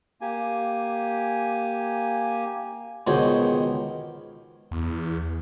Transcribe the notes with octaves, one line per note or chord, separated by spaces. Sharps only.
A#3 G4 G#5
C#2 B2 D#3 C5 G#5
E2